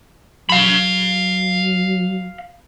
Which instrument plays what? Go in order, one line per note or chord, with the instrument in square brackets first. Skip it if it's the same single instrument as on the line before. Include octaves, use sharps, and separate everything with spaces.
[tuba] F#3 [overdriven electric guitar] F5 B5